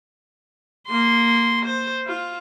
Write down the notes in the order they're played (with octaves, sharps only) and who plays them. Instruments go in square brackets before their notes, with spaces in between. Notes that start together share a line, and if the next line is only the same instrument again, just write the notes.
[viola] A#3 C6
C5
F4